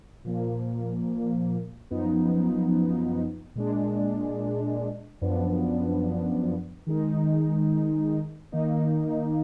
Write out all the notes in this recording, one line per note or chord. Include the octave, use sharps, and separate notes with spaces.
A#2 F3 A#3
F#2 F3 B3 D#4
A#2 G#3 D4
F#2 F3 B3 D4
D#3 G#3 D#4
D#3 A#3 D#4